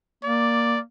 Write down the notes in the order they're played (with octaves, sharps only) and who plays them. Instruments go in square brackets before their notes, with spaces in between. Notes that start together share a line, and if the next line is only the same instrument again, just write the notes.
[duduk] A#3 [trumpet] D5